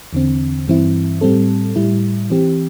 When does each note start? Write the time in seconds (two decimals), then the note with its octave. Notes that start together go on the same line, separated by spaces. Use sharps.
0.13 E2 D3 C4
0.68 G2 E3 C4 E4
1.21 A2 G3 C4 A4
1.76 A2 G3 E4
2.30 E3 C4 G4